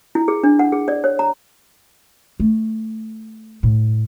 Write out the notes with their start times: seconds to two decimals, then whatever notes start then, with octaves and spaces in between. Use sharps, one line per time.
0.15 E4
0.28 G#4
0.43 D4
0.59 F#5
0.72 G#4
0.88 D5
1.04 C#5
1.19 A#5
2.40 A3
3.63 A2